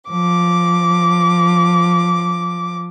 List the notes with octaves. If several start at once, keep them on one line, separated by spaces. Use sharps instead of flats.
F3 D6